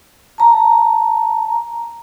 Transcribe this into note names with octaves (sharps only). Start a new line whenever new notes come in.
A5 A#5